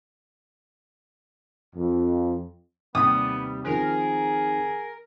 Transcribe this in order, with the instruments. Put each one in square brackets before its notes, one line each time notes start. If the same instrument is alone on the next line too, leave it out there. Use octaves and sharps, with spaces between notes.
[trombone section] F2
[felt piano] D#2 C3 [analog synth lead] G3 [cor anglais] B3 [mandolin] D#6
[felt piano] D#3 F3 C4 [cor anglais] G#4 [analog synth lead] A#4